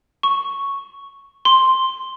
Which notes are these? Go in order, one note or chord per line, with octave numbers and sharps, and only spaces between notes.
C#6
C6